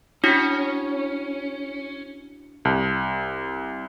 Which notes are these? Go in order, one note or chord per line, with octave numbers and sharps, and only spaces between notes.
C#4 D4 E4 F#4
C2